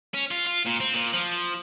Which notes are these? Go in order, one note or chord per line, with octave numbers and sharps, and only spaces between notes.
C#4
F4
F4
A#2
C4
A#2
F3